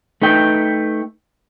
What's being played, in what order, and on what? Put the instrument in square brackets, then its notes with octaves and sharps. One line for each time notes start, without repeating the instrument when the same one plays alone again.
[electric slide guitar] A3 D#4 B4 G5